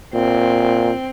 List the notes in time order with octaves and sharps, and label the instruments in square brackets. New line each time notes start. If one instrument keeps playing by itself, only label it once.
[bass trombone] A#2 [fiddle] C4